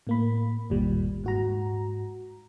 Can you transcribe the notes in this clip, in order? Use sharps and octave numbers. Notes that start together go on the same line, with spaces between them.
A2 A#3 B5
G1 D#2 A#2 G3
G#2 F#4 A#5